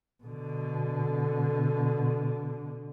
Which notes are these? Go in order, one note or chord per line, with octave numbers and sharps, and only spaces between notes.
B2 D3